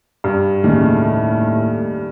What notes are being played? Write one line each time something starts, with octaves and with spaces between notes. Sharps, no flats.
G2
D#2 A2 C#3 A3